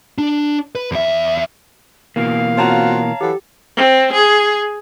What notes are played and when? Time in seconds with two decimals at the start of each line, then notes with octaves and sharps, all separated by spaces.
0.18 D4
0.75 B4
0.92 E2 E5
2.16 B2 E3 A#3 F5
2.57 C4 F4 F#4 C#5 A5 A#5
3.21 E3 F#3 G4 A4
3.77 C4
4.13 G#4